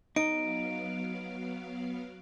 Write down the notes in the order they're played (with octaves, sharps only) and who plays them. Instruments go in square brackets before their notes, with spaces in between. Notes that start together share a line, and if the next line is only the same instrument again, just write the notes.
[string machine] F#3 B3 F5 [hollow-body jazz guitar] D#4 [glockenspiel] D7